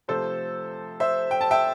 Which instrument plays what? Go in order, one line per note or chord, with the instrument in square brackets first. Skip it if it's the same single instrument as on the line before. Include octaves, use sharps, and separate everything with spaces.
[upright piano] C3 F3 A3 A4 C5
C5 E5
G5
A5
E5 G5